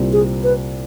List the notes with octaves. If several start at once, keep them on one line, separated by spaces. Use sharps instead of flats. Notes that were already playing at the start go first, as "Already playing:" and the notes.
Already playing: C2 A#2 G3 C4
G#4
B4